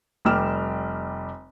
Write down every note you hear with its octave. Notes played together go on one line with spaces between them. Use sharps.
F1 G3 D6 F6 E7